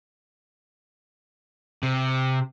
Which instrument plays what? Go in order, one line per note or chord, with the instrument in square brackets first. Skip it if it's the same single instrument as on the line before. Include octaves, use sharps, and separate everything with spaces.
[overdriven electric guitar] C3